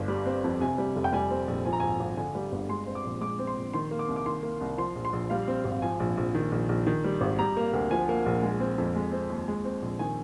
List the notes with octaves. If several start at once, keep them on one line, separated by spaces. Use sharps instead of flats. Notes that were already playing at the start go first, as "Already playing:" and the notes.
Already playing: G1
G3
C4
F2
C3 G#5
G3
F1
G5
G3 G#5
C4
A#1
F3 G#5
A#5
G#1 G#5
G#1
D3 G#5
G3
G1
G#3 C6
C4
D6
A#1
G#3 D6
C4
C6
A#1
D#3 C6
A#3
D6
C2
D6
D#3 C6
A#3
C2
F3 C6
A#1
C6
A#1
G3 F5
C4
G#1
F3 G#5
A#1
A#1
D#3
A#1
A#1
D#3
G3
G#1
G3 A#5
A#3
D2
F3 G#5
A#3
A#1
G#3
C4
F2
G#3
C4
D#2
G#3
C4
A#1
D#3 G#5